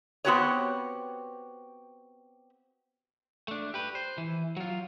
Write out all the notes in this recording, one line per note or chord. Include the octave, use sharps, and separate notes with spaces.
B3 C4 F#4 G4 B4 C#5
A3 D4
G4 B4
C5
E3
F#3 F4